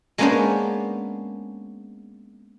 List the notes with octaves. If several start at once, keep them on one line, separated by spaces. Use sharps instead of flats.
G#3 A#3 B3 C#4 D4 C5